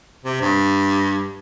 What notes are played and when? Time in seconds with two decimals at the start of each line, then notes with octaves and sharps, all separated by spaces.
0.24 C3
0.41 G2